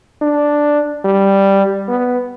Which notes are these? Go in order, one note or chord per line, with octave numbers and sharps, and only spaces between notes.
D4
G3
B3